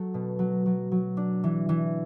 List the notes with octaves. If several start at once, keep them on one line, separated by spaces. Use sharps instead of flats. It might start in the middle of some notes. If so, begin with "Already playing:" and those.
Already playing: F#3 A3 F#4 A4
B2
F#3
F#3
F#3
D4
E3
E3